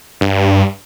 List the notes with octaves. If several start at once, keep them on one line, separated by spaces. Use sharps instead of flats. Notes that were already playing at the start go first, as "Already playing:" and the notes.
G2